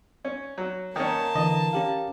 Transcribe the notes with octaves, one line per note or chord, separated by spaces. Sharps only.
C#4
F#3
D#3 A#3 C#4 A5
D3 E3 D#5
C#4 G4 F5